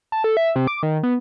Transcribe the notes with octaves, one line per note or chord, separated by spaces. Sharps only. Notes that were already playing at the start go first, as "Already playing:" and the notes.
A5
A4
E5
C3
D6
D#3
B3